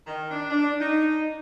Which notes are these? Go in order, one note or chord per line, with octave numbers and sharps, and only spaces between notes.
D#3
D4
D4
D#4